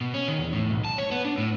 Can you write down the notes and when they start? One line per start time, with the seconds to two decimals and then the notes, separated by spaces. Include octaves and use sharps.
0.01 B2
0.14 C#4
0.28 D#3
0.39 E2
0.53 A2
0.71 B1
0.85 A5
0.98 C#5
1.12 B3
1.25 D4
1.38 A2